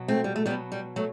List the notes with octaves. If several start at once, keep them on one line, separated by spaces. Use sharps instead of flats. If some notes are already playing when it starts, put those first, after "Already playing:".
Already playing: B2 F#3
A3 C4
G3
A3
B2 F#3 G3 B3
G3
F#3 A3